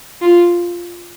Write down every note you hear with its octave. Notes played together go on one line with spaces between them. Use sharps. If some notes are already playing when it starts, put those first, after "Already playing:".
F4